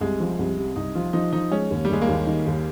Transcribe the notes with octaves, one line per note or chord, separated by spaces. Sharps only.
C2 G#3
F3
C2
C3
C2 D#4
F3 F4
F3 D#4
F3 D#4
G#3 C#4
D#2
G3
D#2 G#3
A#3
D#2
D#3
D#2